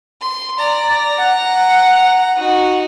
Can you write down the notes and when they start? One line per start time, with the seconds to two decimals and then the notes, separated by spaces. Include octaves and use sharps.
0.21 C6
0.59 D5 A#5
1.18 F#5
2.37 D#4 F#4